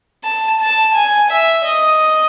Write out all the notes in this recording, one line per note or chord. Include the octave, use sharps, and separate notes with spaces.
A5
A5
G#5
E5
D#5